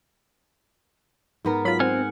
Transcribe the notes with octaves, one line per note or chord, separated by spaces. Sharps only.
G#2 B3 A#4
F#3 F4 B5
C4 F#5 G#5 F6